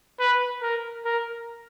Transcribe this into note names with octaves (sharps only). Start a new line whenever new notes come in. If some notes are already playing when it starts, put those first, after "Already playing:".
B4
A#4
A#4